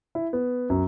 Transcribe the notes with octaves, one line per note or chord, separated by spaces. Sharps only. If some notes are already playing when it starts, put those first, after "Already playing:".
E4
B3
F#2